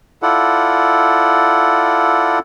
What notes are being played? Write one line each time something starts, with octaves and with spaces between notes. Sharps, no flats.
E4 F4 A4 D5 F#5